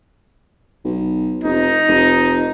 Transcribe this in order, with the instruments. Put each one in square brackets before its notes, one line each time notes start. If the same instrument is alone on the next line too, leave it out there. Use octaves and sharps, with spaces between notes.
[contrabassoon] B1
[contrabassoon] F1 [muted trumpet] D#4
[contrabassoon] F1